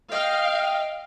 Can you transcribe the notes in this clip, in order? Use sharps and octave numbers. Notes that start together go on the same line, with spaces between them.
D#5 F5 G5